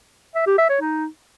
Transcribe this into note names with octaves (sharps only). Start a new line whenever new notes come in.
E5
G4
E5
C#5
D#4